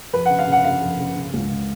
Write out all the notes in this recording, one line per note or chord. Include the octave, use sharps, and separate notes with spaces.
F2 B4
F#5
C#3
F5
C#3
F#5
C#3 F5
F2
C#3
C#3
C#2
C#3